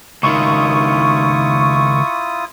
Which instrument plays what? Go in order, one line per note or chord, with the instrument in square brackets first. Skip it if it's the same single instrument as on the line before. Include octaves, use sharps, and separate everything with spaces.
[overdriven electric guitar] C#2 D#3 [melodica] E4 F4 D#6 [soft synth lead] C#6